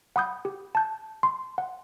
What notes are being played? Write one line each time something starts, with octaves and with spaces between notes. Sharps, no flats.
F#5 B5 D#6 G6
G4
A5 G6
C6
F#5